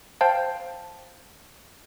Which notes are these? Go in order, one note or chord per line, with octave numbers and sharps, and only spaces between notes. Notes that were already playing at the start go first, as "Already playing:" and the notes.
C5 F5 G5 A5